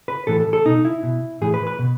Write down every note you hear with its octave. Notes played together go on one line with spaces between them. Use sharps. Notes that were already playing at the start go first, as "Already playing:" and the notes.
B4
A2 E3 A4
A4
A4
B2 D#4
E4
B2
A2 E3 G#4
B4
B4
B2